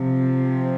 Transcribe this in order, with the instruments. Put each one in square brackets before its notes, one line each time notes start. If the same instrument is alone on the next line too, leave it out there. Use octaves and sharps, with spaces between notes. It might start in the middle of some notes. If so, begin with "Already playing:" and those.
Already playing: [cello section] C3 F3